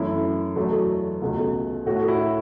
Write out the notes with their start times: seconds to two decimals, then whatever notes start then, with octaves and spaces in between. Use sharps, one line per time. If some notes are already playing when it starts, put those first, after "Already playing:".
Already playing: F#2 E3 A3 E4
0.56 E2 B2 F#3 A3
1.21 C#2 B2 A3
1.86 A2 A3 F#4
2.08 E4